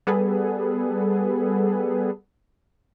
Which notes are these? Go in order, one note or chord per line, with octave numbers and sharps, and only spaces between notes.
G3 B3 G#4 A4 B4